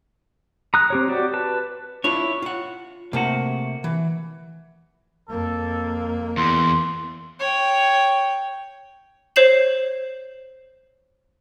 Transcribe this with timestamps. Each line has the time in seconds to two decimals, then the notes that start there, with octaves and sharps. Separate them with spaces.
0.74 A#5 D#6 F#6
0.90 C4 G4 C#5
1.09 F#4 G4 D5
1.34 B4 A5
2.04 D4 E4 F4 C#5
2.42 F4 F#5
3.13 C3 A3 A#3 F#4
3.84 E3
5.28 F2 A#3 A4
6.37 E2 C6
7.40 C#5 G5
9.36 C5 C#5 G6 C7 E7 F#7